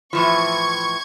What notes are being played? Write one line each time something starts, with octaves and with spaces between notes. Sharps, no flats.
A2 E3 F3 C#6 G#6